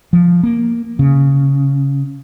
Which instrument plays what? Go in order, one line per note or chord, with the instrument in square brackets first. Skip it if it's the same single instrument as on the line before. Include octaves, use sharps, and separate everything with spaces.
[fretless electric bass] F3
A#3
C#3